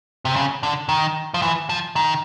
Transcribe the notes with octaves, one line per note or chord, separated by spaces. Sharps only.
C3
C#3
D3
D#3
F3
E3
F3
D#3